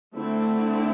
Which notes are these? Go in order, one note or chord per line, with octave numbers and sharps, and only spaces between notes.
D3 A3 C4 E4